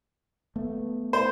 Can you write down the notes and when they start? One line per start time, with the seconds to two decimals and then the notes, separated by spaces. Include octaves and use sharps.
0.56 A3 B3
1.13 C5